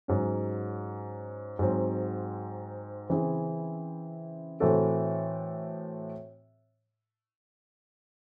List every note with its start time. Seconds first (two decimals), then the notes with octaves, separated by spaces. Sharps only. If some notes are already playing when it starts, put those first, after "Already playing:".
0.08 G#2 F#3 C#4
1.59 G#2 F#3 C4
3.10 C#3 E3 C4 E4 G#4
4.60 A2 E3 C4 F#4 A4